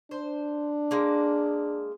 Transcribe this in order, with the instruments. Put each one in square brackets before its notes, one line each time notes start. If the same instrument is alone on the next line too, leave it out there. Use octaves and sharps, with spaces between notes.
[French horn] D4 [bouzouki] C5
[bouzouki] G#3 A#3